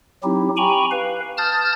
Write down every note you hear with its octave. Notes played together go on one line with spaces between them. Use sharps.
F#3 C4 D#4 E4 G4
G4 G5 G#5 A#5 B5 C#6
B4 F5
A5 D#6 F6 G6 A6